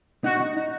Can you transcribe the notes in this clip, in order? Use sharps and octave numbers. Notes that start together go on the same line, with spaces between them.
D#4 F#4
D#4
D#4